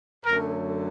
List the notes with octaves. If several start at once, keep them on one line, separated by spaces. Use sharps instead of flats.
F#2 D3 F#3 A3 A#4